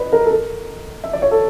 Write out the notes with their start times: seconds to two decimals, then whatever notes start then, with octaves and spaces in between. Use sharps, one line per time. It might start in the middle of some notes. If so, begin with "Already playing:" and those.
Already playing: B4 D5 D#5
0.13 A#4
0.25 A4
0.31 A#4
1.04 E5
1.13 D5
1.22 C#5
1.31 A4